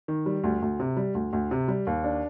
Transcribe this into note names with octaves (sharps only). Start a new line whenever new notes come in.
D#3
G3
D2
D2
C3
G3
D2
D2
C3
G3
D#2
D4